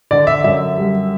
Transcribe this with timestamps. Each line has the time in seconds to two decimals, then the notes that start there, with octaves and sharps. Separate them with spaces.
0.11 D3 D5
0.27 E5
0.44 F#2 E5
0.78 G3